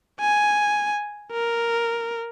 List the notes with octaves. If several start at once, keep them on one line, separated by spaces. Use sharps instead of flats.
G#5
A#4